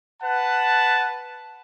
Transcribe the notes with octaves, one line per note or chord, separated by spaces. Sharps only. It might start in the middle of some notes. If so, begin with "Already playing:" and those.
B4 F#5 A5